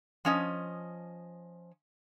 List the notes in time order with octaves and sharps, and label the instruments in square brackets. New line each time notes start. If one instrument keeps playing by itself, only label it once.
[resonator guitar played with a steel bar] F3 C#4 D#5